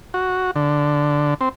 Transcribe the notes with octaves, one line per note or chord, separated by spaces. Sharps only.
F#4
D3
C4